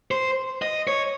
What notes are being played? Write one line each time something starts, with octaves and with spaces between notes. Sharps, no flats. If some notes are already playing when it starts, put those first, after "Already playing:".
C5
D#5
C#5